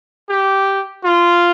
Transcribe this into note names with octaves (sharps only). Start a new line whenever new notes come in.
G4
F4